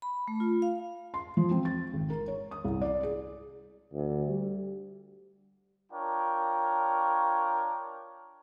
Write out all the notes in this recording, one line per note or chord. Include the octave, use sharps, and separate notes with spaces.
B5
A3
F4
F5
C6
F3
C4
A6
G#1
A#4
C#5
D#6
C2
D5
G#4
D2
G3
D4 F4 A#4 C#5 G5